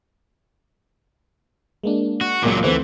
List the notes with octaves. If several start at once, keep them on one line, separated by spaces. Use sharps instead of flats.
G#3 A#3 D4
F#4
C#2 A#2 F#3 A#3 D6
D2 E3 A3 C4 B4 C5 F#5